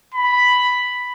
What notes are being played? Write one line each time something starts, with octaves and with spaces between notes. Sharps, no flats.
B5